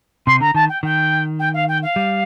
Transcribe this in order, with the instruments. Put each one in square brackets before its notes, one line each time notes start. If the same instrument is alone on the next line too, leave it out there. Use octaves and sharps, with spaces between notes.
[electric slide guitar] C3 [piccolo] C6
[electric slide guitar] D3 [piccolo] A#5
[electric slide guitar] D#3 [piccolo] A5
[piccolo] G5
[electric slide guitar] D#3 [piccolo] G5
[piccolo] G5
F5
G5
F5
[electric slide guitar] G3